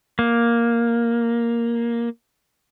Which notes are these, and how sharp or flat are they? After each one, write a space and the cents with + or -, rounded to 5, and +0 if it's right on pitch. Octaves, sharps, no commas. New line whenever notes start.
A#3 +5